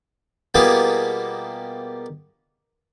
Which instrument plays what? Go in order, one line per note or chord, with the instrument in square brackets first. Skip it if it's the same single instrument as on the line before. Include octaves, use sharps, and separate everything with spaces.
[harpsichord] B2 G3 A#3 B3 F4 G#4